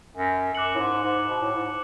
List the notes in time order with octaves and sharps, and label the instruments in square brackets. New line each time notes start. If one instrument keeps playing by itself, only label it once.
[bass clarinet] F#2
[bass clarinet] F#2 [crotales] D6 F#6 C#7 F#7
[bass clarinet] A2
G#2
G#2
B2
A2
G#2